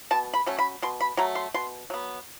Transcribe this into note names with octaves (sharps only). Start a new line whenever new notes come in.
B2 A5
B5
F#3 A3 C#4
B5
B2 C6
B5
F#3 A3 A#5
C6
B2 C6
F#3 B3